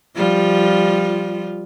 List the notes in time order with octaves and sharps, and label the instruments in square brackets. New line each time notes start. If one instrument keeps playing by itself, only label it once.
[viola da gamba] F3 G3 F4